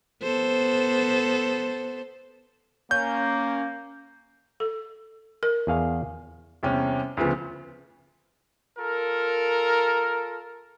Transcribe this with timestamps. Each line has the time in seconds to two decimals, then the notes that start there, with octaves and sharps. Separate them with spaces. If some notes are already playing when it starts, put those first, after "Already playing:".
0.22 B3 A4 C5
2.91 A#3 C#4 G6
4.60 A4
5.43 A#4
5.67 E2 G#4 F5
6.63 E2 C3 G3 C#4
7.17 D2 C#3 F3 B3
8.78 F4 A4 A#4